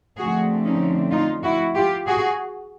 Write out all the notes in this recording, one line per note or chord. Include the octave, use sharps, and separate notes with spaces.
F2 D3 F3 A3 C4 F#4 G#4
C#4 D#4
D#4 F4
E4 F#4
F4 G4
F#4 G#4